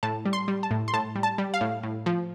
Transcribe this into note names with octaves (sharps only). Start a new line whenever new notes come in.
A2 A5
G3
C6
G3
A5
A2
C6
A2 A5
G3
A5
G3
F5
A2
A2
F3